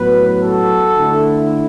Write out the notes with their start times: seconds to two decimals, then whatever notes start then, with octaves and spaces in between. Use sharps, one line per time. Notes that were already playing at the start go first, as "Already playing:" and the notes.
Already playing: A2 F#3 B3 B4
0.41 F#4 A4
0.96 D3 A3 E4